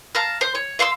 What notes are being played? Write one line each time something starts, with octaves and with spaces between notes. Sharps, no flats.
F5 A5 A#5 F6
C5
C#5
E5 F5 C6 E6